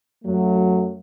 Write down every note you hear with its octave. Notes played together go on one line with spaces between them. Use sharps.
F#2 F#3 A3